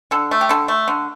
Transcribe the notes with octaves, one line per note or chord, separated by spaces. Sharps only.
D3 A4
A3
G4
D3 A4
A3
D3